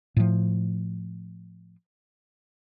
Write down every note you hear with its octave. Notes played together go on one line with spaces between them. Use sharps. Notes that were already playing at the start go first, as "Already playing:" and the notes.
A2 F3